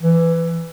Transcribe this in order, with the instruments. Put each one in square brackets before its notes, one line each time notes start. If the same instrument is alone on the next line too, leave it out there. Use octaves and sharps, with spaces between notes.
[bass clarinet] E3